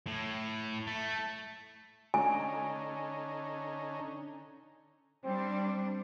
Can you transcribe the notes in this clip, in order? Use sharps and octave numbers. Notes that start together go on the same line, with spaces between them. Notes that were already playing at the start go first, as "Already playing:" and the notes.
A2
A3
D3 C#4 D#4 G#5
G3 C4 D4